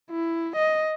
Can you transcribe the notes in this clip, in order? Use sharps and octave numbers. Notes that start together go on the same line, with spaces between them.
E4
D#5